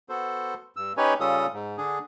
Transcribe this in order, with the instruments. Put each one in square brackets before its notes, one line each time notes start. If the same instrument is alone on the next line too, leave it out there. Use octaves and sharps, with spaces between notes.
[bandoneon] B3 F#4 A4 C5
G2 E6
C#4 D#4 G4 B4 C#5 G#5
C#3 G3 C#4 F4 A4 D#6
G#2
D3 D4 G#4